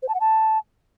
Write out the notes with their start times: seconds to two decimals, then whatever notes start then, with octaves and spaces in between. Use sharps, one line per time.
0.02 C5
0.08 A5
0.14 F#5
0.20 A5